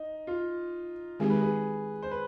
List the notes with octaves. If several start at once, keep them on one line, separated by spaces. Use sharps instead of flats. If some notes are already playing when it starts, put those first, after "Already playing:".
Already playing: D#4
F4
D#3 G#3 C4 D#4 G4 G#4
B4
G#4
C5
B4